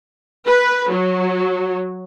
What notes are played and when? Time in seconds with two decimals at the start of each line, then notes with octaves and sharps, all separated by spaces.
0.47 B4
0.91 F#3